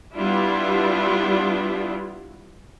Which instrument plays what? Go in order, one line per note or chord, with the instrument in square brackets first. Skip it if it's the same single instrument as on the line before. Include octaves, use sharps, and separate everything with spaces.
[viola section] G3 B3 D4 E4 F4